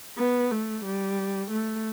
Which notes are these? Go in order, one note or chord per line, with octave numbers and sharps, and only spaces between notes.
B3
A3
G3
A3